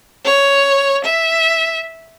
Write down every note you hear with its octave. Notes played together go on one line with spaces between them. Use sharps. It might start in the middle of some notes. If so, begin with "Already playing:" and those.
C#5
E5